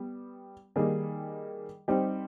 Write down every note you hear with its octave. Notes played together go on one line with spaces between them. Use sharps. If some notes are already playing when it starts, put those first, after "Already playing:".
Already playing: G3 B3 G4
D#3 G3 A#3 D#4 G#4
G3 C4 D#4 G4